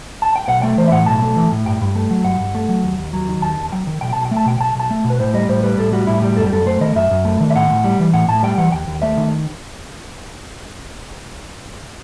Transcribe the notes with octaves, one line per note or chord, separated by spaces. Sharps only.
A5
G5
B1 F#5
A3 G5
E3 C5
E5
A2 F#5
B1 A5
A3
E3
A2
G2 G5
G2
A3
F#3
G2 F#5
G2
A3
F#3
D#2
D#2
F#3
D#3
D#2 A5
D#2
F#3 G5
D#3
B1 G5
B1 A5
G5
A3
A5
B2 G5
B1 A5
B1 A5
A3
B2
B4
A2 C5
G3 D#5
A2 C5
G3 B4
A2 A4
G3 F#4
A2 E4
G3 G4
G4
F#2 A4
G4
F#2 A4
A3 C5
D#3 D#5
F#2 E5
F#2
A3
D#3
E5
A2 F#5
A2
G3
E3
A2 F#5
A2 A5
G3 G5
E3 F#5
D#2 G5
D#2
A3 E5
D#3